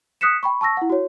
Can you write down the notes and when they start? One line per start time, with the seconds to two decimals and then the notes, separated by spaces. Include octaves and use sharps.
0.21 D#6 F#6 B6 C#7 E7
0.43 G5 B5 C#6
0.61 A5 C#6 E6 A#6
0.77 E4 F#5
0.90 F#4 C#5